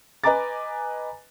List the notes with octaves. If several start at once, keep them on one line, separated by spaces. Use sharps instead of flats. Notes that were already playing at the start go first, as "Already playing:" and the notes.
B4 D#5 G#5 A#5 D6 A6